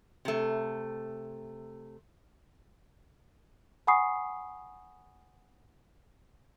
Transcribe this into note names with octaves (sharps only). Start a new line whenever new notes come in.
C3 A3
F#5 G#5 B5 C#6 D#6 C7